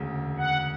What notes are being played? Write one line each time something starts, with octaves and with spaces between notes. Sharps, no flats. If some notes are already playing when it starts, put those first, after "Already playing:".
Already playing: E1 D2 C#3
F#5